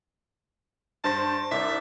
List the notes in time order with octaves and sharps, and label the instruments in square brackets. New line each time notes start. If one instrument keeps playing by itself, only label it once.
[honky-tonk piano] G2 C5 A#6 [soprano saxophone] A5
[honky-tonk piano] C2 D5 [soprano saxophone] E5